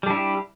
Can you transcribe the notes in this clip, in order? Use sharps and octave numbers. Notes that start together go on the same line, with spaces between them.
G3 D4 E4 G4